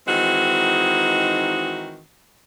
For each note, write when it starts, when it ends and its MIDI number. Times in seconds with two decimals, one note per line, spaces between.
0.08 2.02 51
0.08 2.02 52
0.08 2.02 56
0.08 2.02 60
0.08 2.02 63
0.08 2.02 66